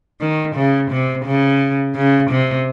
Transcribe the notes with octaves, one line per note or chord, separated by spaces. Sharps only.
D#3
C#3
C3
C#3
C#3
C3